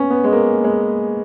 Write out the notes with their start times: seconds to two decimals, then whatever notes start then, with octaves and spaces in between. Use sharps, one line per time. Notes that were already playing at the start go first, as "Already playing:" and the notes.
Already playing: B3 C#4
0.10 B3
0.24 G#3
0.32 A#3
0.64 G#3